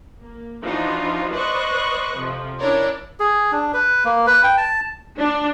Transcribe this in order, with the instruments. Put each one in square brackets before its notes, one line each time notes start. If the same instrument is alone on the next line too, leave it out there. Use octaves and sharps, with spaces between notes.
[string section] A#3
E3 F3 D4 D#4 F4 F#4
B4 C5 D5 D#5 C#6 F#6
F2 C3 F3
C#4 D4 E4 A#4 C#5 D5
[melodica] G#4
D4
B4
A#3
B4
G5
A5
[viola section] D4